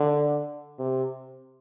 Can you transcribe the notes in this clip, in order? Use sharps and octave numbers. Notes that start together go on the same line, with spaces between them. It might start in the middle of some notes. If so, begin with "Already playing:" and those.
Already playing: D3
C3